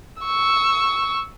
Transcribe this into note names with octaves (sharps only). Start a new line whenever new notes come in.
C#6 E6